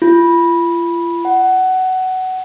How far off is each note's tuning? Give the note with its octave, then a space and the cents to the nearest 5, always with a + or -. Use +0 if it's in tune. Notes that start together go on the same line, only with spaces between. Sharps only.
F4 -35
F#5 +15